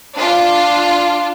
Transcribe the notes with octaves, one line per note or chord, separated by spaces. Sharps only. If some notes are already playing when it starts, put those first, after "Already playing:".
D4 F4